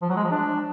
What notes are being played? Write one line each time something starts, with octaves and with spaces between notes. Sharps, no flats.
F3
F#3
G#3
F3
D4